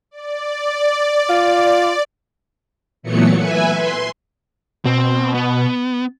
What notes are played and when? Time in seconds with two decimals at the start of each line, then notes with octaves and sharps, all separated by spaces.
0.11 D5
1.30 F4
3.03 A#2 E3 F#3 A3 B3 C#7
3.36 B4 E5 G#5
3.74 C6
4.85 B2 C4
5.34 B3